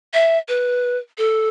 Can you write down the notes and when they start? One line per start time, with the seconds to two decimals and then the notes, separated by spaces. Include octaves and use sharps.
0.14 E5
0.48 B4
1.18 A4